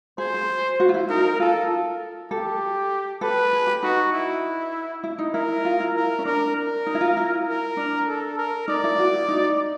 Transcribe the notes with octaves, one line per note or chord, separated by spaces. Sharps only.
G#4 C5
G#4
F#4
F4
E4
D#4 A#4
F4 A4
G4 A4
A4 B4
G#4
G4
D#4 F#4
E4
E4
D#4
E4 A#4
F4
E4
A#4
C#4
D4 A#4
A#4
D#4
E4
F4
E4
A#4
D4
A4
A#4
D#4 D5
E4
F#4
E4
D#4